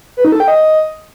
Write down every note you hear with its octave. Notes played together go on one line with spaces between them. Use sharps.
B4
D#4
A4
G5
D#5